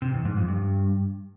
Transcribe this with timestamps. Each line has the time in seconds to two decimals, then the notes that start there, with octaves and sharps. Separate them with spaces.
0.02 C3
0.13 E2
0.25 G#2
0.36 F2
0.48 G2